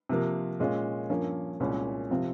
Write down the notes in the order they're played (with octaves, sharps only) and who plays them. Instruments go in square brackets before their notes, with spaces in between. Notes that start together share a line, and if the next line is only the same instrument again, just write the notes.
[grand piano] C3 F3 A#3
A#2 G#3 C#4 F4
G2 F3 A#3 C#4
C2 A#2 G#3 C#4
C3 F3 C4 F4